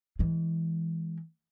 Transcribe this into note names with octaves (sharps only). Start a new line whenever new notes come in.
E3 G#3